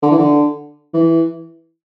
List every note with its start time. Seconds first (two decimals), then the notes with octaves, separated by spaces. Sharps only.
0.03 D3
0.11 E3
0.19 D3
0.94 E3